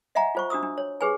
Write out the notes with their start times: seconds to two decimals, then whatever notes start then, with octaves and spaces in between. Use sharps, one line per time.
0.15 D#5 E5 F#5 G#5 A#5
0.35 F4 C5 C#6
0.50 D4 F#4 D#6 E6
0.63 D4
0.78 C#5
1.01 G4 G#4 B4 C#5 G#5